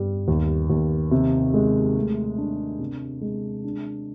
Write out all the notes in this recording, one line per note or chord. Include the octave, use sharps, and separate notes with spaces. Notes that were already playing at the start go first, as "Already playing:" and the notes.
Already playing: G2 G3
D#2
D#2
C3
G#3
A3
D4
C3
G#3
D4